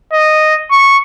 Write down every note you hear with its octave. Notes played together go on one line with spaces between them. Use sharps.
D#5
C#6